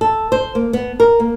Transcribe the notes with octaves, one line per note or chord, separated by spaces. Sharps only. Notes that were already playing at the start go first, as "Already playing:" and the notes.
A4
C5
A#3
B3
A#4
A#3